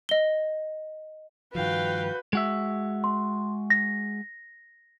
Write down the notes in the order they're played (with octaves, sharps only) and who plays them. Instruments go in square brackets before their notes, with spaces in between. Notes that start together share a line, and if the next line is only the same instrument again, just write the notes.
[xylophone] D#5 G7
[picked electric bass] G2 D#3 F3 [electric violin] F#4 G6 [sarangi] B4 [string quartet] F5 G5
[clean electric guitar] G#3 F#4 E5
[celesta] C6
A#6